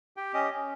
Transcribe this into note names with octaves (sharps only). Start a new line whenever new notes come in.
G4 G5
C#4 D#5
C#4